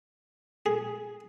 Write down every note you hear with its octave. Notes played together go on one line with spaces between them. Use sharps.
G#4